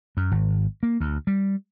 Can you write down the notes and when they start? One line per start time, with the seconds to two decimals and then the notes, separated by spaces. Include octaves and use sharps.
0.17 F#2
0.31 G#1
0.83 A#3
1.00 D2
1.27 G3